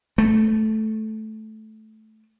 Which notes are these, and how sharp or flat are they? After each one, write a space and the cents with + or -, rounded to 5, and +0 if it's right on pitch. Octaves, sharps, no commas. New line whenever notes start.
A3 -10